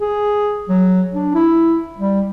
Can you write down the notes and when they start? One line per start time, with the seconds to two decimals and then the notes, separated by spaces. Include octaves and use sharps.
0.01 G#4
0.69 F#3
1.14 D4
1.35 E4
1.98 G3